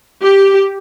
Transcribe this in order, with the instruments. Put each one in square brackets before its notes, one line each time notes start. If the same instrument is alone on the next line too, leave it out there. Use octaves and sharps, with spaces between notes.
[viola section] G4